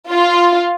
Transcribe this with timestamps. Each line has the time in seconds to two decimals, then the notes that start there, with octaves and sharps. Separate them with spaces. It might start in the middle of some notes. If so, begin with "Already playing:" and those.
0.10 F4